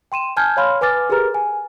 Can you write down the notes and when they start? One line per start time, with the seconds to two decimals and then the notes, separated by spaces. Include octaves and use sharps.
0.12 G5 C6 D#7 E7
0.37 G#5 A5 F6 G6 G#6
0.57 C#5 F5 B5 C6 F6
0.81 B4 G#5 D6 F6 A6
1.09 G4 G#4 A#4 B4 A#5 F6
1.34 G#5